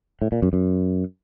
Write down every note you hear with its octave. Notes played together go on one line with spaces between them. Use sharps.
A2
A#2
F#2
F#2